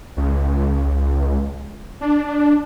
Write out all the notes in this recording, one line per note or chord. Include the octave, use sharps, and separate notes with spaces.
C#2
D4